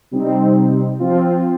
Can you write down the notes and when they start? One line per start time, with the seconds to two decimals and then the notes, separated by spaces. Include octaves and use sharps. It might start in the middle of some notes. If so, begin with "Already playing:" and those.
0.11 C3 G3 C4 D#4
1.00 F3 C4 F4